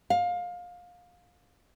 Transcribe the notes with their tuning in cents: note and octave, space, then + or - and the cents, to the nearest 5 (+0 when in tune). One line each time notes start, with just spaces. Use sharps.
F5 +25